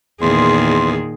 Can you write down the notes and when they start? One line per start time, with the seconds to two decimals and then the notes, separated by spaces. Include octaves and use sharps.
0.22 E2 A#2 D#3 G#4 C6